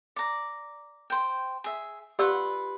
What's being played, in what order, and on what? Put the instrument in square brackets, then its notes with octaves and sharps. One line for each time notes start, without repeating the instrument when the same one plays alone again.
[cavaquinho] D5 A#5
C5 G5
G#4 E5
[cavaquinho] F4 B4 F#5 [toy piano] G4 D5 E6